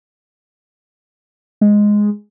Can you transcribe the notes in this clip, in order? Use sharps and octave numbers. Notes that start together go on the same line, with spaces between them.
G#3